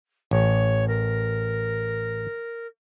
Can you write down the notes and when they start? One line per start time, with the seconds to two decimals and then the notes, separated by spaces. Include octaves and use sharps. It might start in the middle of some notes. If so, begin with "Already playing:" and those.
0.31 A1 C#5
0.87 A#4